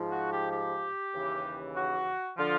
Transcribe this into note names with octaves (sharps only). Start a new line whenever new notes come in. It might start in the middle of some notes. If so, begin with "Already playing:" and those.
Already playing: G#2 F3
F#4
G4
G4
D#2 C#3 E3
F#4
D3 F3 F4